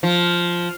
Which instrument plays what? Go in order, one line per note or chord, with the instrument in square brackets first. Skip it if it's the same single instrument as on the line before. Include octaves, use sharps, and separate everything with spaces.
[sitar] F3